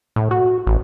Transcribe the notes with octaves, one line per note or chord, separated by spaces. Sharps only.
A2
F#4
A1